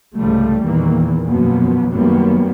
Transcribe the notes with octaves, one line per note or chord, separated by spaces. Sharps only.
C2 G#2 C#3 F3 G3 A3
E2 A#2 D#3 E3 A#3
F#2 B2 F3 A#3 B3
F#2 D#3 G3 A#3 B3